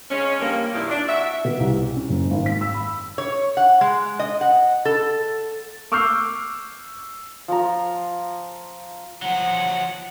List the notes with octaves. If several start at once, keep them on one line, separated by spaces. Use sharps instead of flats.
C#3 G#3 C#4
G2 F3 A#3
F2 A#2 D#3 G3 E4
D4
E4 F#4 E5
B2
C2
C#4
F#1
G#1
B6
E6
B5
C#5
F#5
G#3
D#5
F#5
A4
C#6 D6 E6 F6 G6 C7
F3 A#5
F3 F#3 F#5